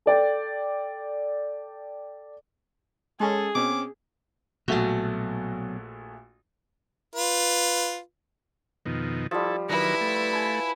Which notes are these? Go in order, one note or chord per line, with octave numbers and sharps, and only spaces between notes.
A4 D5 G5
G#3 C#4 G#4 A4
B2 C4 C#4 D6
A#1 B2 F#3 A3 F#4
F4 B4
F2 B2 D#3
F3 G3 E4 A4
D#3 F#3 E4 A#4 B4
A3
G#5 B5